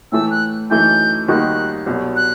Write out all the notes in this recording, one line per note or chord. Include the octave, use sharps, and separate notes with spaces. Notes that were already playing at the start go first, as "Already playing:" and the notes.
A2 E3 A3 E6
F#6
F#2 E3 A3 D#4 G6
D#2 D#3 G3 D#4 F#4 F#6
C2 B2 F#3
F#6